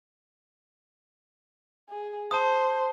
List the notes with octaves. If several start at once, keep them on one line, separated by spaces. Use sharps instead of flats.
G#4
C5 A5 D#6